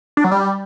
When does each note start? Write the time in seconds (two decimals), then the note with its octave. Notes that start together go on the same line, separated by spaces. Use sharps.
0.17 D4
0.24 F#3
0.31 G3